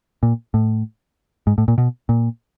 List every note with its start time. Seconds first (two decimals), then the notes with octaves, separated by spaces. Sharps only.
0.23 A#2
0.54 A2
1.47 G#2
1.58 A2
1.68 A#2
1.78 B2
2.09 A#2